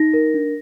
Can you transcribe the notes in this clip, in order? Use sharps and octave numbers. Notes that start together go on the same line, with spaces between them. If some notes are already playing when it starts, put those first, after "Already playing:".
Already playing: D#4 A#6
A#4
D4